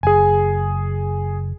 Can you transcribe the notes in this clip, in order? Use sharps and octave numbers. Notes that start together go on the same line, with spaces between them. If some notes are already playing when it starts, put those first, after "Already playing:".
F#1 G#4 G#5